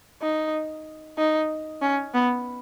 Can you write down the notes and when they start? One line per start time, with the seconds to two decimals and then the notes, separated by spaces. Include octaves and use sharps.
0.22 D#4
1.18 D#4
1.82 C#4
2.14 B3